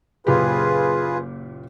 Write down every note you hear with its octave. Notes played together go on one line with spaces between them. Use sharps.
F#1 A#2 F4 G4 G#4 B4